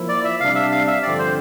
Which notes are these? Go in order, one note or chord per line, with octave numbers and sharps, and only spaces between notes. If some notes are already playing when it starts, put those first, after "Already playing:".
Already playing: F3 A#3 E4
D5
E5
C3 G3 D4 F5
E5
F5
E5
G2 D3 F3 C4 D5
C5